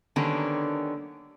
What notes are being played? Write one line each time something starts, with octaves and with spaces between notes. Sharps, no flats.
D3 D#3 G3 A#3 B3 C#4